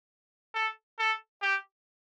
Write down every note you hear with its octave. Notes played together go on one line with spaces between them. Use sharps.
A4
A4
G4